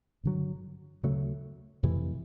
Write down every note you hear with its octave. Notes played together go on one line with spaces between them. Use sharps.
G2 D3 F#3
D2 C#3 F#3 A3
F2 C3 E3 A3